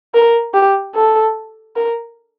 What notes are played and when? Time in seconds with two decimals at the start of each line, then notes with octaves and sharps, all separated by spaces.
0.14 A#4
0.54 G4
0.95 A4
1.76 A#4